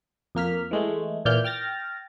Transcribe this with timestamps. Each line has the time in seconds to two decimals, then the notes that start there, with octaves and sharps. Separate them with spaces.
0.35 F2 A#3 F6 B6
0.71 E3 G#3 A3
1.25 A#2 E3 D5 F6 G6
1.44 G5 F6 A6 A#6